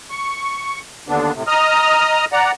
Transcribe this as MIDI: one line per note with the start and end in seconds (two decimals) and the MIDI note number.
0.11 0.79 85
1.08 1.32 39
1.08 1.32 50
1.08 1.32 59
1.08 1.32 62
1.34 1.43 45
1.34 1.43 48
1.47 2.25 75
1.47 2.25 82
1.47 2.25 87
1.47 2.25 89
2.32 2.52 74
2.32 2.52 78
2.32 2.52 82